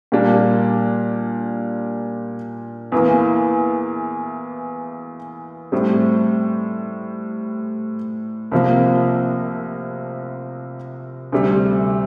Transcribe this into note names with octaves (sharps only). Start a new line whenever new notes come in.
A#2 G3 A#3 D4
E2 E3 A#3
A2 G3 C4
C2 C3 F3 A#3
D2 C3 G3